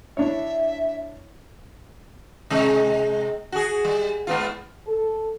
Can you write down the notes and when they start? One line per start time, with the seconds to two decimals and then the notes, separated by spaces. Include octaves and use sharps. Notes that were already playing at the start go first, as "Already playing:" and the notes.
0.17 D4 E4 C#5 E5
2.50 C3 G#3 D#4
3.52 F#4 G#4
3.85 G3
4.27 G#2 B3 F4
4.87 A4